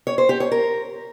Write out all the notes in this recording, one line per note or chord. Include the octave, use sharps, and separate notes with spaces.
C#5
C5
G4
C#5
A#4